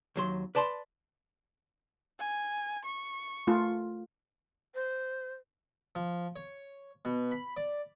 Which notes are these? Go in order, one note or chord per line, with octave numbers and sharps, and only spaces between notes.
D#2 F#3 C6
B4 D5 A5 B5 C6
G#5
C#6
A3 F4
C5
F3
C#5
B2
B5
D5